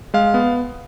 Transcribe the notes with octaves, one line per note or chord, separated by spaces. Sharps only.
G#3 F5
B3